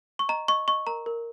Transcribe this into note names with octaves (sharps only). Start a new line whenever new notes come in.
C#6
D#5 A#5
D#5 C#6
D#5 C#6
A#4 A#5
A#4